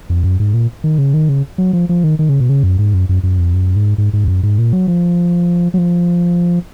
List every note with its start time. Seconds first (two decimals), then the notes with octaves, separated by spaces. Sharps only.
0.10 F2
0.24 F#2
0.40 G#2
0.54 A#2
0.84 D#3
0.98 C#3
1.14 D#3
1.29 C#3
1.58 F#3
1.73 F3
1.89 F3
2.04 D#3
2.19 D#3
2.29 C#3
2.40 B2
2.49 C#3
2.63 F#2
2.79 G#2
2.94 F#2
3.09 F#2
3.23 F#2
3.38 F2
3.54 F#2
3.76 G#2
3.98 G#2
4.13 G#2
4.24 F2
4.28 F#2
4.43 G#2
4.58 A#2
4.73 F#3
4.88 F3
5.74 F#3
5.78 F3